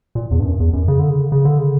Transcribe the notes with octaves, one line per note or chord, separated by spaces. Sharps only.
A#2
E2
G2
F#2
E2
F#2
C#3
D3
C#3
C#3
D3
C#3